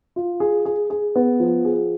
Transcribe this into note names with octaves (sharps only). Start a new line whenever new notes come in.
F4
G#4
G#4
G#4
B3
F3
G#4